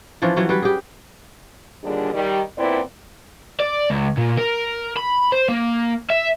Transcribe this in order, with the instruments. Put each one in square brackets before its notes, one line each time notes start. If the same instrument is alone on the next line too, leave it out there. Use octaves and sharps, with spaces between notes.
[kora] E3 F3 C#4 D4
E3 F#3 C#4
F#3 G3 B4
G4 G#4
[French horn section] D#2 A#2 D3 G3 D4 G#4
D#3 G3
A#2 B3 C4 E4 B4 D5
[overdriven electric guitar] D5
C#2
A#2
A#4
B5
C5
A#3
E5